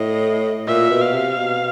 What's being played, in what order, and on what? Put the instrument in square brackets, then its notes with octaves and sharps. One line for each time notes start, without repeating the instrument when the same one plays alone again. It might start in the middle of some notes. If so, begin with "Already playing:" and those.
Already playing: [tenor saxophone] A2 [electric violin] D#5
[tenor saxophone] A#2 [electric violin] E5
[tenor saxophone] B2
[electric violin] F5
[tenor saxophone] C3
B2